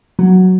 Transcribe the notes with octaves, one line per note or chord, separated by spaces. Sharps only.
F#3